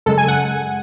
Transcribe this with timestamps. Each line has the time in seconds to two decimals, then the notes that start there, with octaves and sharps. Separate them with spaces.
0.06 F#2 C#3 G#3 A4
0.18 G#5
0.28 F#5